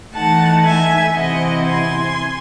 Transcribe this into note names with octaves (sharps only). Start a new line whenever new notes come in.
E3 A3 D#4 F#5 A5
E5 G#5
C3 E3 C4 E4 D#5 F#5
G#5 C6